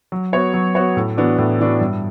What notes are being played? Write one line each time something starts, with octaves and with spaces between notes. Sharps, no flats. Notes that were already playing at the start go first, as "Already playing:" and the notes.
F#3
B3 F#4 C#5
F#3
B3 F#4 C#5
A2
E3 B3 D4 F#4
A2
E3 B3 D4 F#4
G2